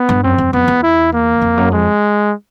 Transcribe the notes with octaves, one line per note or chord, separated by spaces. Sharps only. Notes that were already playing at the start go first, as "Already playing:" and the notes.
Already playing: B3
G2
F#2 C4
F2
F2 B3
E2
E4
A#3
F2
F#2
F2 G#3